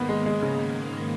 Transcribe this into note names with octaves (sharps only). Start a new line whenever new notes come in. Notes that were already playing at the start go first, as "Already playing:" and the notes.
Already playing: G#2 D#3 A#3 B3
G#3
G#3
C#3